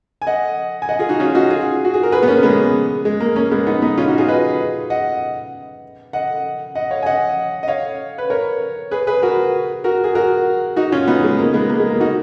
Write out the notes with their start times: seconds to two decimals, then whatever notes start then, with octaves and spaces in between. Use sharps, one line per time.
0.22 G#5
0.27 D#5 F#5
0.82 G#5
0.89 D#5 F#5
0.99 F4 G#4
1.09 D#4 F#4
1.20 C#4 F4
1.35 D#4 F#4
1.50 F4 G#4
1.85 F#4
1.94 G#4
2.03 A#4
2.12 G#4 B4
2.23 B3
2.28 A#3 C#4
2.43 G#3 B3
3.05 G#3
3.20 A#3
3.36 A#3 C#4
3.51 G#3 B3
3.67 B3 D#4
3.82 B3 D#4
3.97 C#4 F4
4.08 D#4 F#4
4.18 F4 G#4
4.28 B4 D#5
4.90 D#5 F#5
6.13 D#5 F#5
6.75 D#5 F#5
6.91 C#5 F5
7.02 G#5
7.06 D#5 F#5
7.63 D#5
7.68 C#5 F5
8.18 B4
8.30 A#4 C#5
8.91 G#4 B4
9.07 G#4 B4
9.22 F#4 A#4
9.84 F#4 A#4
10.04 G#4
10.15 F#4 A#4
10.76 D#4 F#4
10.92 C#4 F4
11.08 B3 D#4
11.24 G#3
11.39 A#3
11.54 G#3 B3
11.70 A#3
11.80 G#3
11.90 A#3
12.00 D#4 F#4